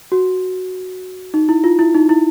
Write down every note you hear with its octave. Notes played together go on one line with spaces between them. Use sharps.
F#4
D#4
E4
F4
E4
D#4
E4